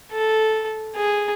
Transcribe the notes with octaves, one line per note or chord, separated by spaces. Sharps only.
A4
G#4